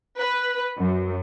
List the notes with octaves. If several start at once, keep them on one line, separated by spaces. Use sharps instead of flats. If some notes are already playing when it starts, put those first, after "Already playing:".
B4
F#2